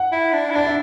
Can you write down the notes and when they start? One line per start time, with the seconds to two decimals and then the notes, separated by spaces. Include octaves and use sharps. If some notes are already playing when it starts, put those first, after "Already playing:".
Already playing: F#5
0.12 E4
0.33 D4
0.50 E4
0.55 D4 D5
0.66 E5